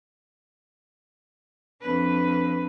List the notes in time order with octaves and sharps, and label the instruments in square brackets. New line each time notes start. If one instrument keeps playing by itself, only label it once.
[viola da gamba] F2 D4 B4